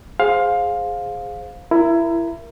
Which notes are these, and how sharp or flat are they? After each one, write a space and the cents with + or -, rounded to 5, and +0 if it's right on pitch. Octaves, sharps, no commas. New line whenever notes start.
G#4 +0 C5 +0 F5 +15
E4 +20 A#4 +0